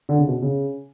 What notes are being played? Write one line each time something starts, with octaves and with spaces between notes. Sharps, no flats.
D3
C#3
B2
C#3